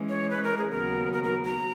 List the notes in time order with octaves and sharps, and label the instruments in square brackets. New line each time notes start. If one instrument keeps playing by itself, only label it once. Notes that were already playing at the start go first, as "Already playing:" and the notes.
Already playing: [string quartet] E3 G#3 C#4
[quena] C#5
B4
A#4
G#4
[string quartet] D#2 C#3 F#3 B3 F#4 [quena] A#4
[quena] A#4
A#4
A#5